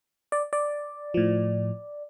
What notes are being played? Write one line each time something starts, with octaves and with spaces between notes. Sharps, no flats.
D5
D5
A2 F3